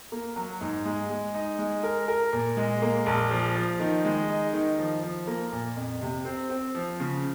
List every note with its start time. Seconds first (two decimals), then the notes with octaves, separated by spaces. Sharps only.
0.12 A#3
0.36 F#3
0.61 G#2
0.85 G#3
1.10 G#3
1.34 D#4
1.59 G#3
1.83 A#4
2.08 A#4
2.33 A#2
2.57 G#3
2.82 A#3
3.06 A#1
3.31 F3
3.56 F3
3.80 D#3
4.05 G#3
4.29 D#4
4.53 D#3
4.78 F3
5.03 F3
5.27 A#3
5.52 A#2
5.76 F2
6.01 C3
6.25 C4
6.50 C4
6.75 F3
7.00 C#3